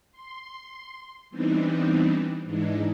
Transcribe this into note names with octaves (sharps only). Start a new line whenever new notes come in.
C6
E3 G3 B3 C4 D4 D#4
G#2 E3 G#3 D4 D#4